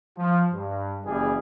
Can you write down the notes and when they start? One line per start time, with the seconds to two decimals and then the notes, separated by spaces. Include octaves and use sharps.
0.18 F3
0.52 G2
1.05 F#1 E3 G3 G#4